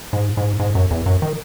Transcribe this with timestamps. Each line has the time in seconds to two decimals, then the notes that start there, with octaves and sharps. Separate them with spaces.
0.13 G#2
0.37 G#2
0.60 G#2
0.75 F#2
0.91 E2
1.06 F#2
1.22 D#3